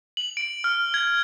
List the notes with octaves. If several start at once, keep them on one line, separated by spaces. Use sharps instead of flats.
F#7
D7
F6
G#6